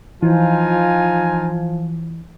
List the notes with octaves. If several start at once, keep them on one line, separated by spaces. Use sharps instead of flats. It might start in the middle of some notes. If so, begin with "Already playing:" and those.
E3 F3 D#4 F4 G#5